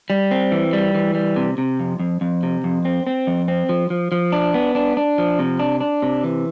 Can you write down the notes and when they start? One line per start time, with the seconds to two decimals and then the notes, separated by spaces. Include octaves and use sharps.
0.10 G3
0.31 C4
0.52 E3
0.73 G3
0.95 E3
1.15 G3
1.36 C3
1.58 C3
1.80 F2
2.00 F2
2.21 F2
2.43 C3
2.64 F2
2.85 C4
3.07 C4
3.27 F2
3.48 C4
3.69 F3
3.90 F3
4.12 F3
4.32 D4
4.54 B3
4.75 D4
4.97 D4
5.18 F3
5.39 C3
5.59 D4
5.81 D4
6.02 C3
6.24 E3